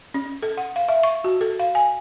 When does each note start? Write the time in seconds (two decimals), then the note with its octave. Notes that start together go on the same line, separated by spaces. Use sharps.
0.14 C#4
0.43 A4
0.57 F#5
0.76 F5
0.89 E5
1.03 C#6
1.24 F#4
1.41 A4
1.59 F5
1.75 G#5